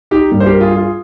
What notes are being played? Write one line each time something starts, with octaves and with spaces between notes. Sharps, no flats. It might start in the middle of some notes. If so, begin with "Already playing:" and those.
D#4 G4
G2 G3 A#3
C5
G4 A#4
F4 G#4
F4 G#4